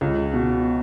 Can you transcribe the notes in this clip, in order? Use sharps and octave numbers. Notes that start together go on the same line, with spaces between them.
C#2
B2